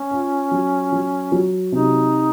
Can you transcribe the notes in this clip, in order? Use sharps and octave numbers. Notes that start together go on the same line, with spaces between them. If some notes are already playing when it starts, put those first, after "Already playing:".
Already playing: C#4
F4
F#3
F#3
F#3
C3 D#4